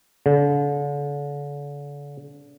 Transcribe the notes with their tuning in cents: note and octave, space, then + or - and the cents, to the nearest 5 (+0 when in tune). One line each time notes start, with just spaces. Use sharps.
D3 -40